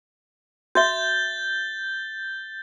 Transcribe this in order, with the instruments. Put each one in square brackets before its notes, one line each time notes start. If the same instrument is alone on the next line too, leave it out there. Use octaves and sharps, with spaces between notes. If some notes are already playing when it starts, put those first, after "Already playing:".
[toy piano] F#4 E5 [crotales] G6 A6 G7